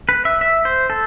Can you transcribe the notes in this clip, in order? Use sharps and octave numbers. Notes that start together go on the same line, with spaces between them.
B4
E5
E5
C5
A4